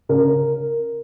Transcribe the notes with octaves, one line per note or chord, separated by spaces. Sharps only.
C#3 A#4